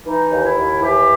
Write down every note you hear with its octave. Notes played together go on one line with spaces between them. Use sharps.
E3 D#4
D#2
E4
D#2
E3 G4